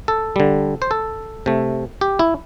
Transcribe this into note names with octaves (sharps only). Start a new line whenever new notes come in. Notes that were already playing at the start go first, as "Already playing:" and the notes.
A4
D3 G3
C5
A4
C3 A3
G4
E4